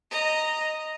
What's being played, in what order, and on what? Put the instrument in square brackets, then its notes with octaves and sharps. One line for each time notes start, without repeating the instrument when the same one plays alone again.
[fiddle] D#5 A#5